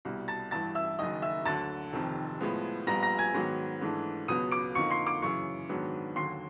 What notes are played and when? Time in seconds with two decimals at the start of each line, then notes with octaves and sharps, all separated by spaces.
0.05 C2 B2 G3
0.28 A5 A6
0.51 A1 G2 E3 A5 A6
0.75 E5 E6
0.99 F#1 F#2 D#3 D#5 D#6
1.22 E5 E6
1.45 D2 D3 F#3 A5 A6
1.93 F1 F2 C3 D#3
2.41 A2 F3 G#3 B3
2.87 A#1 A#2 G3 B3 A#5 A#6
3.03 A#5 A#6
3.19 G#5 G#6
3.34 G#2 D#3 F#3 B3
3.81 G#2 E3 A3 D4
4.28 C#2 B2 F#3 B3 D#6 D#7
4.52 D6 D7
4.75 F2 D3 F3 A#3 D#4 C#6 C#7
4.91 C6 C7
5.07 D6 D7
5.22 F#2 C#3 E3 C#6 C#7
5.69 G#2 D#3 F#3 B3 D4
6.16 D#2 D3 F#3 C6 C7